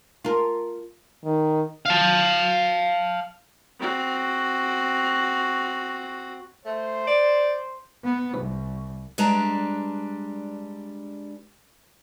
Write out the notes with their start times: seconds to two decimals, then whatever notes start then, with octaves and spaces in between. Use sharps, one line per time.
0.25 F4 A#4
1.24 D#3
1.86 F5 A5
3.80 C4 F#4
6.65 A3 C5
7.07 D5
8.04 B3
8.38 C2
9.18 G3 G#3 D4 B4 A5 A#5